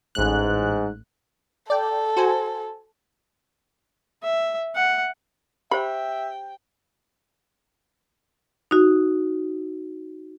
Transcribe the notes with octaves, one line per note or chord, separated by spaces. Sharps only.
A1 G#2 F#6
A4 D5 G5
F#4 C5 G#5
E5
F#5
G4 C5 E5 G5 B5
D#4 F#4